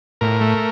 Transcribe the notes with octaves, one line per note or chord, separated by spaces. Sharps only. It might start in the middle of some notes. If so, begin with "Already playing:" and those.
A2 A#4
A3